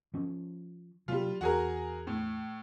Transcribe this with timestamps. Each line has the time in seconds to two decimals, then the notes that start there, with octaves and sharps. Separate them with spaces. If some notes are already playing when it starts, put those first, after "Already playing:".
0.14 F3 C#4
1.08 C3 F#3 G3 A#3 F4
1.41 E2 F#4 G#4 A#4
2.07 A2